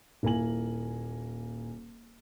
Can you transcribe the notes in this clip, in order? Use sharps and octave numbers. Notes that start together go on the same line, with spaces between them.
D#1 A#3 E4 G#5 F#7